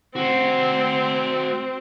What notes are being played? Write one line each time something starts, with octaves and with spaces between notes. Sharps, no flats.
C4 F#4 C5